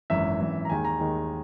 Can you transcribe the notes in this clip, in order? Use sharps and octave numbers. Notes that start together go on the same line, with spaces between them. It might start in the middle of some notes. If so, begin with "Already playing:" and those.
G#1 F#2 E3 E5
G#1 F#2 E3
A#5
D#2 D#3 G#3 G#5
A#5
D#2 D#3 G#3